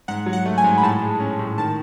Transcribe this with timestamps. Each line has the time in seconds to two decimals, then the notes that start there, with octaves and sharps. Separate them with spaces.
0.08 G#2 F#5
0.26 F#3
0.33 F#5
0.46 A3
0.58 G#5
0.64 G#2
0.78 B5
0.83 A2 A5
1.02 G#3
1.20 C#4
1.39 A2
1.57 D#3 A5